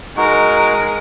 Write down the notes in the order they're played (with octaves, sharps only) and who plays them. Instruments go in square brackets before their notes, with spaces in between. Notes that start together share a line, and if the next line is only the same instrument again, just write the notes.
[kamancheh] G#3 A#4 [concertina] D#4 F#4